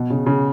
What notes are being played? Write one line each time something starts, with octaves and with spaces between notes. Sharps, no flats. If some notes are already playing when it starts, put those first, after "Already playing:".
Already playing: B2
C#3
C#3